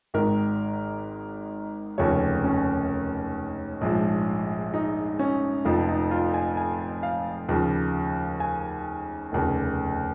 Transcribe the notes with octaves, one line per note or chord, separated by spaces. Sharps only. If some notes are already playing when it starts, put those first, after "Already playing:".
G#1 G#2 D#3 A#4
F1 D#2 C#3 F3 C#5
C#4
A#1 G#2 F3
D#4
C#4
F1 F2 F3 D#4
D#4
F4
G#5
G#5
F5
D#2 C#3 F3
G#5
F1 D#2 C#3